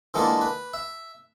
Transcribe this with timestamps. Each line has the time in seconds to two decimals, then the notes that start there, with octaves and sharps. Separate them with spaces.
0.14 D3 E3 G#3 A#3 F4 A4
0.41 B4
0.74 E5